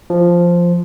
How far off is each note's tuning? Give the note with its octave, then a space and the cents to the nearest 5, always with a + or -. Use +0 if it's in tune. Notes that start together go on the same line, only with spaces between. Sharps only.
F3 -5